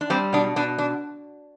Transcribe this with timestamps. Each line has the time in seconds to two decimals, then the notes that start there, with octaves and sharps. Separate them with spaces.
0.01 D4
0.10 G3 C4
0.33 B2 D4
0.56 B2 D4
0.78 D4